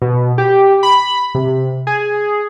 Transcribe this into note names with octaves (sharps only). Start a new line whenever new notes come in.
B2
G4
B5
C3
G#4